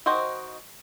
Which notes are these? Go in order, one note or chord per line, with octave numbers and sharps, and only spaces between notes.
D#3 F#4 C5 D#5